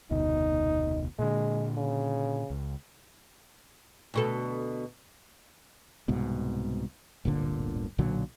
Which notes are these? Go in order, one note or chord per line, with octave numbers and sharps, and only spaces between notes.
F1 D2 B2 D#4
A#2 D3 G#3
C#3
C#2
D2 B2 A4
C2 G#2 B2
D1 G1 A#2 D3
B1 A#2 D3 F#3